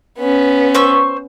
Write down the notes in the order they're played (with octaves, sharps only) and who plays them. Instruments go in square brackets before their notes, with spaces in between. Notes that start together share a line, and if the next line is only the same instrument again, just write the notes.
[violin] B3 C#4
[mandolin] C5 C#6 E6